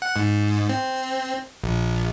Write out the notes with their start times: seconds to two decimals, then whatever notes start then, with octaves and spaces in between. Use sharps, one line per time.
0.02 F#5
0.16 G#2
0.70 C4
1.64 A#1